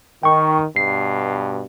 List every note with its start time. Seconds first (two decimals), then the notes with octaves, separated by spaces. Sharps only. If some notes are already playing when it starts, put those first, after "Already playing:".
0.23 D#3 G5 C#6
0.76 G2 B2 C7